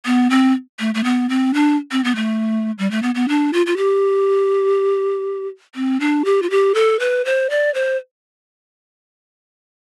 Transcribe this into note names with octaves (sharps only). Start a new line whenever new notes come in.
B3
C4
A3
A3
B3
C4
D4
C4
B3
A3
G3
A3
B3
B3
D4
F4
F4
G4
C4
D4
G4
F4
G4
A4
B4
C5
D5
C5